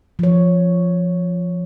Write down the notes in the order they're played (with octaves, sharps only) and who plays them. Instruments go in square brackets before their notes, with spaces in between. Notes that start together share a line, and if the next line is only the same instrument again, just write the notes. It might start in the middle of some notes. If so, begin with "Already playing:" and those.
[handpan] F3 C#5